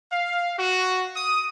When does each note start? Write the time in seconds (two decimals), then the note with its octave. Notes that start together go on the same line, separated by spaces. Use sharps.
0.12 F5
0.58 F#4
1.16 D#6